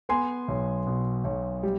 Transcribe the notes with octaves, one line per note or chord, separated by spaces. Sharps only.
B3 G#5 C6
B1
B2
B1
G3